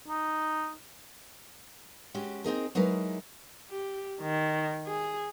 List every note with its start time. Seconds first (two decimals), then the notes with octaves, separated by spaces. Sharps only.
0.08 D#4
2.14 G#3 C#4 F#4 G4
2.44 C4 D#4 G#4 A#4
2.75 F#3 G#3 D#4 E4 A#4 B4
3.70 G4
4.21 D#3
4.87 G#4